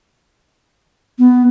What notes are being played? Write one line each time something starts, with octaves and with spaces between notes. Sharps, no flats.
B3